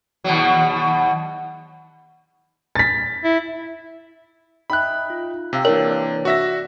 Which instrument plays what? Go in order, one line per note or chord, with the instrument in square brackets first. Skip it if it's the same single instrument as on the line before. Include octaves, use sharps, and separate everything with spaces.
[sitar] D#2 B2 F#3
[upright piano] A6 B6
[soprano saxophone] E4
[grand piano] D#4 E5 G5 [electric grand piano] B5 F#6
[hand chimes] F4
[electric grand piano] C3 [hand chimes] F5 G5 E6
[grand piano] E3 A#3 D4 [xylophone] A#4 [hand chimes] C#5
[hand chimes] C#5
[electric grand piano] F#4 E5 A#6 [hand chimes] D5